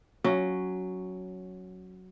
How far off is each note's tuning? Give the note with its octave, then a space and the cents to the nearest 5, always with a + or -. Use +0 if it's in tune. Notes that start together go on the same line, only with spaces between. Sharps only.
F#3 +0 C#4 +0